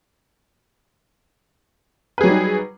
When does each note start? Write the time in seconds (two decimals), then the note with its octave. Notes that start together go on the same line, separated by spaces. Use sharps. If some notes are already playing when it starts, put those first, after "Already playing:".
2.18 B4
2.21 G#4
2.23 F#3
2.26 G3
2.29 D#4